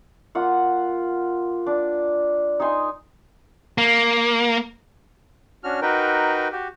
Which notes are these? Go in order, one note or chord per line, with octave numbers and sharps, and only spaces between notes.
A#3 F4 F#5
D4
D#4 C5 G#5 C6
A#3
C#4 D4 F#4 F6
D#4 F#4 A#4 B4 G5
F#4 G4